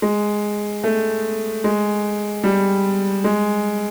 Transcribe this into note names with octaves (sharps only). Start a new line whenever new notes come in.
G#3
A3
G#3
G3
G#3